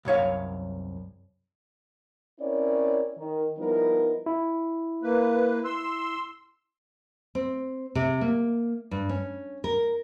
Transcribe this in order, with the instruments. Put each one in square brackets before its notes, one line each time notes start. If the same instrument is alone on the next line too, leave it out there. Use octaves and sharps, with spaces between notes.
[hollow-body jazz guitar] C2 F#2 C#5 F5
[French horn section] C4 C#4 E4 A#4 C#5 D5
D#3
F3 G3 B3 D#4 E4 A#4
[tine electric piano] E4
[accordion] A#3 B4
C6 E6
[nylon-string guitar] C4
C3
A#3
G2
C#4
A#4